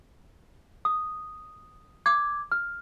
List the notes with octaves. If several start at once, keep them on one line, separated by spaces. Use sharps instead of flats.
D#6
D6 G#6
F6